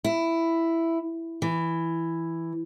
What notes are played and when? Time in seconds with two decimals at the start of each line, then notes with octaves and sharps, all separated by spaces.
0.04 E4
1.42 E3